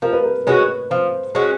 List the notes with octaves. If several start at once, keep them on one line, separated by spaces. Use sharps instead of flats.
F3 A#4
B4
A#4
G#3 C#4 F#4 B4
F3 C5
G#3 C#4 F#4